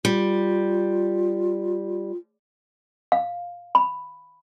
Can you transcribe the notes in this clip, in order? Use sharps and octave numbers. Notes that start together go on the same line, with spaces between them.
G3 F4
F5
B5